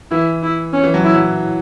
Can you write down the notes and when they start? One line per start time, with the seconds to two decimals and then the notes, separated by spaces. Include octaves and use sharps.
0.11 E3 E4
0.43 E4
0.73 C#4
0.84 E3
0.94 F#3
1.04 E4
1.15 F#3